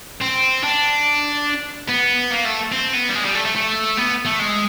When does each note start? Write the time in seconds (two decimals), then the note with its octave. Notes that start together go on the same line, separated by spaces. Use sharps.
0.22 C4
0.63 D4
1.88 B3
2.31 A#3
2.45 A3
2.72 C4
2.93 B3
3.09 G3
3.14 G#3
3.25 G3
3.35 A3
3.45 A3
3.56 A3
3.97 B3
4.25 A3
4.39 G#3